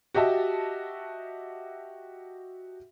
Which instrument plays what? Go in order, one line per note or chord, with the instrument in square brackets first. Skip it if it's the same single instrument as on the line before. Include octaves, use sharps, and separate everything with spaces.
[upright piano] F#4 G4 D#5 E5 A5